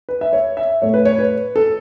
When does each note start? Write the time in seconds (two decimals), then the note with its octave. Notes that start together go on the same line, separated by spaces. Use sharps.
0.09 B4
0.21 E5
0.33 C#5
0.57 E5
0.82 A2 A3 C#5
0.94 B4
1.05 C#5
1.19 B4
1.56 A4